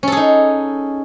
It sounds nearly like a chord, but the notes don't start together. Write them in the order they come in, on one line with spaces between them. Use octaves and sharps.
C#4 A4 G#4 D#4